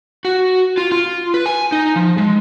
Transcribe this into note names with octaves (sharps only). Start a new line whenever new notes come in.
F#4
F4
F4
B4
G#5
D#4
F3
G#3